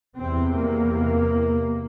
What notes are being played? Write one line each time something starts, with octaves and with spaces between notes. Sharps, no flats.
E2 C3 C4
A#3